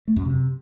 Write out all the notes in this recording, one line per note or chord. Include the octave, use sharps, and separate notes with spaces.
A3
F#2
C3